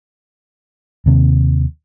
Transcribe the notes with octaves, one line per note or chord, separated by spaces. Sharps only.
D#2 C3